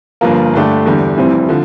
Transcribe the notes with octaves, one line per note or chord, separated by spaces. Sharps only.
G1 G2 F3 A#3
G2 D3 A3 D4 G4
E2 D3 G3
F1 F2 E3 G3 C4
D3 F3